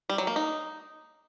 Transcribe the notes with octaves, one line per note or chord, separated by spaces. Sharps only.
G3
F#3
A#3
D#4